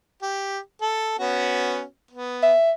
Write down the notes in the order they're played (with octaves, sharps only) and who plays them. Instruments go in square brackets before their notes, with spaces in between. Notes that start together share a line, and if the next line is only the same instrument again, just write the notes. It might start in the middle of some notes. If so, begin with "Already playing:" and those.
[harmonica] G4
A4
B3 C#4 F#4
B3
[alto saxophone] E5